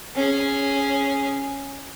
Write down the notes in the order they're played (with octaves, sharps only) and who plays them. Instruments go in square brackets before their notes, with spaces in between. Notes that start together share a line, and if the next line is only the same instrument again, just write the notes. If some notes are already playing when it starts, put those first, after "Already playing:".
[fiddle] C#4 G#4